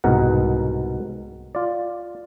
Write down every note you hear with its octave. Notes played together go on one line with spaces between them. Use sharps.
C2 G#2 B2 A#4 F#5
F4 D5